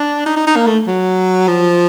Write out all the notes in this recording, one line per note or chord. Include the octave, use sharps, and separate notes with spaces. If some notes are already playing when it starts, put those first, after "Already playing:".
Already playing: D4
D#4
D#4
D#4
A#3
A3
F#3
F3